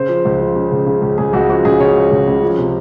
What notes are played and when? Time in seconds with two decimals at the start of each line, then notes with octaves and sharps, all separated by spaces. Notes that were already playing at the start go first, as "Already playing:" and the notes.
Already playing: C#3 C5
0.09 F3
0.25 C#2
0.40 F3
0.56 C#3
0.72 C#2
0.87 C#3
1.02 C#2
1.18 C#2 G#4
1.33 C#2 F#4
1.49 F3 F#4
1.65 C#2 G#4
1.80 C#3 C#5
1.96 C#3
2.11 C#2
2.27 C#2
2.43 F3
2.58 C3